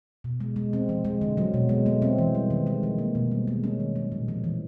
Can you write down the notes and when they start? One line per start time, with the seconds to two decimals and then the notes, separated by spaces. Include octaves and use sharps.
0.24 B2
0.40 G#3
0.56 G#3
0.73 C4
0.89 F3
1.05 G#3
1.21 D3
1.37 F#3
1.54 B2
1.69 G#3
1.86 A3
2.02 C4
2.18 E3
2.35 G3
2.50 D#3
2.67 G#3
2.83 F3
2.98 A#3
3.15 B2
3.31 G3
3.48 G#3
3.64 C#4
3.80 D#3
3.96 F#3
4.12 A#2
4.28 F3
4.44 E3